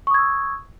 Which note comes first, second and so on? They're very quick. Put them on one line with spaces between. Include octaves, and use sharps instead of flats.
C#6 D#6 G#6 E6